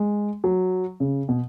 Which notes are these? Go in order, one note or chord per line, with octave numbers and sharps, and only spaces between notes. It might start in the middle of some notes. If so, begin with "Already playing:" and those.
Already playing: G#3
F#3
C#3
B2